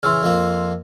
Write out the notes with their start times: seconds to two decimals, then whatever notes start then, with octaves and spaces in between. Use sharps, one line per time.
0.03 C#3 E3 C6 E6 F6
0.23 F2 F3 A#3